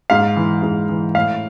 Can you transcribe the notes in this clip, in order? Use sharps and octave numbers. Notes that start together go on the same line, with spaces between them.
G#2 F5
E3
G#2
E3
A2 F5